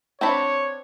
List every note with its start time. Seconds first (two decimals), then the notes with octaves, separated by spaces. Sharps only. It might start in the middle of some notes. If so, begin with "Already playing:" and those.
0.21 C4 D4 C#5 B5